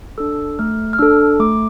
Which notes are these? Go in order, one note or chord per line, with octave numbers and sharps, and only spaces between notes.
D4 A4 E6
A3 F6
F6
D4 A4 E6
A3 D6